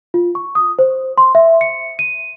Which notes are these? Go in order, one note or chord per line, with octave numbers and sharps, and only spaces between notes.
F4
C#6
D#6
C5
C6
E5
C#7
D#7